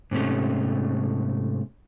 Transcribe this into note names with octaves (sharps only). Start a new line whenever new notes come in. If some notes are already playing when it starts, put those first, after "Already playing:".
G#2 C3 A3 C#4